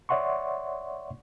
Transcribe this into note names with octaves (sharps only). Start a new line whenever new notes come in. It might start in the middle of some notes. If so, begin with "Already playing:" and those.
C#5 D5 E5 F#5 C6 C#6